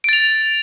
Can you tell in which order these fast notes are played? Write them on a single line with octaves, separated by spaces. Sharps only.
D7 A6 F7